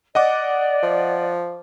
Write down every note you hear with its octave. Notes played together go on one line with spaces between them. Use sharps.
D5 D#5 F#5 D6
F3